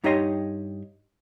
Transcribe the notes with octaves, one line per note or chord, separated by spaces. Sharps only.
G2 D#4 G4 C#5 D#5 C6